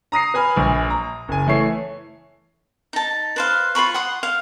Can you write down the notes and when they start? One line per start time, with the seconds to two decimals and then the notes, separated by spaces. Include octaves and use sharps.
0.12 A#5 D#6 A#6 C7
0.34 B4 G#5 B5 D#6 F6
0.56 A#1
0.90 A#5
1.28 F#1 G#5
1.47 E3 A3 C#5 C7
2.93 D#4 A5
3.36 B4 C5 F5
3.75 F4 B4 B5 C#6
3.94 F#5 C6 D#6
4.23 F5